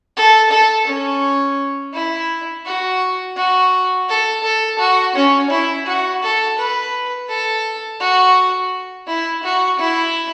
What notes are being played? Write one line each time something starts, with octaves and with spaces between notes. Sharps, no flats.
A4
A4
C#4
E4
F#4
F#4
A4
A4
F#4
C#4
E4
F#4
A4
B4
A4
F#4
E4
F#4
E4